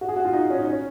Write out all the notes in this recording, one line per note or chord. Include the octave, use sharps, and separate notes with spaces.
F#4
G#4
F#4
F4
D#4
C#4
D#4
C#4